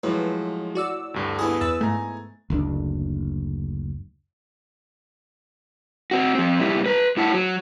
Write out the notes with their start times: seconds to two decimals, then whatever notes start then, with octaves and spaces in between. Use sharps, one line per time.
0.03 A2 F3 F#3 G#3 B4
0.75 F#4 D5 E6
1.14 D2 G2 D3
1.39 B3 E4 G#4
1.61 E2 B4 E6 A6
1.81 G#2 A3 G#5 A#5
2.50 F#1 D2 C3 D4
6.11 C4 F#4
6.35 F3 C4
6.59 A#2 G3 E4 G4 E5
6.86 B4 A#5
7.17 A2 E4 F#5 A5
7.33 F#3